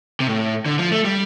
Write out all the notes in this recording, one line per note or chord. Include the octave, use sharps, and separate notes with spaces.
C3
A2
D3
F3
A3
G3